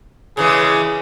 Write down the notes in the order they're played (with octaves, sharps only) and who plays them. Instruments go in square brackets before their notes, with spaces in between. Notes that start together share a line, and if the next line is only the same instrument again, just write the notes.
[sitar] C#3 E3 G#3 [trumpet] G#4